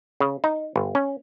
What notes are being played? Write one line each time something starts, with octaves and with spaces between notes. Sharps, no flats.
C#3
D#4
G1
C#4